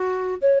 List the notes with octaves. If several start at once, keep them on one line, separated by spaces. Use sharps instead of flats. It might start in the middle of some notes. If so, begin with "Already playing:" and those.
Already playing: F#4
C#5